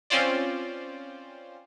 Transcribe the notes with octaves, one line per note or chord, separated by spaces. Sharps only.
C4 C#4 F4 C5 D5